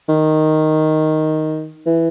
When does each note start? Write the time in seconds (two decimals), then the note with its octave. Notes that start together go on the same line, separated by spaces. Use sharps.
0.09 D#3
1.86 E3